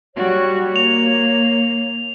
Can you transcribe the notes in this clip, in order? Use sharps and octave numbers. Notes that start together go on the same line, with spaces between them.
G3 F#4 C#5
A#3 F7